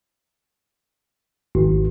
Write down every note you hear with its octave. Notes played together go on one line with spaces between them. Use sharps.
G#1